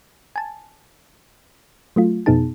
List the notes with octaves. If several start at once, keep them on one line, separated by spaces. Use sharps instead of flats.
G#5 A5
F#3 A3 F4
F2 B2 B3 D#4 G#4 A5